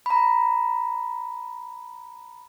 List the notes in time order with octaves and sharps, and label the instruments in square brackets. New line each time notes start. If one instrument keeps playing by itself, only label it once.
[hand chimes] A#5 B5